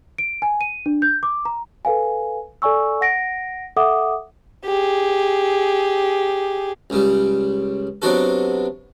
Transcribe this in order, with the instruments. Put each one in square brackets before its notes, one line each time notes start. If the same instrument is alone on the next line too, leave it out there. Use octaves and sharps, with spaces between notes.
[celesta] D7
G#5
D#7
D4
G6
D6
A#5
A4 B4 F5 G#5
A4 D5 G#5 C#6 E6
F#5 A#6 D7
A4 E5 F#5 D6 D#6
[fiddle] G4 G#4
[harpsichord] C#2 C#3 G3
C3 F#3 B3 D4 F#4 A4